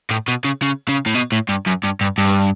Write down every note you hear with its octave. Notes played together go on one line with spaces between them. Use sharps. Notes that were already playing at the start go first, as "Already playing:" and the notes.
A2
B2
C#3
C#3
C#3
A2
B2
A2
G2
F#2
G2
G2
G2